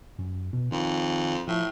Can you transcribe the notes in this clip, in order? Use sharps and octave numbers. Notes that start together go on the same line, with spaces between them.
F#2
B2
F2 D#3
A2 F3